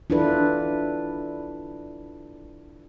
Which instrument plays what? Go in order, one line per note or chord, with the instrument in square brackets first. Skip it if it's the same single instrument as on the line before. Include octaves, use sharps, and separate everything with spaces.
[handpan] D4 E4 F4 A4 B4